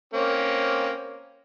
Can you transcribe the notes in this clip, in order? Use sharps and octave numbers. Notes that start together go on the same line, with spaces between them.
A#3 C4 C#4